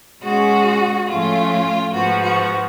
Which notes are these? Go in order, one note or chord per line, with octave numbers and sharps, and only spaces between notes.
B2 G#3 C#4 F#4
A2 F3 A3 C#4 F4
G#2 F3 B3 F#4
F#4